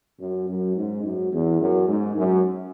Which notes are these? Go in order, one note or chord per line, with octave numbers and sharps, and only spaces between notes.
F#2
F#2
G#2
F#2
E2
F#2
G#2
F#2